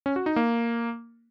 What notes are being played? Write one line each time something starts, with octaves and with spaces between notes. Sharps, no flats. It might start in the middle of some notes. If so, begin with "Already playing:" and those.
C#4
F#4
D#4
A#3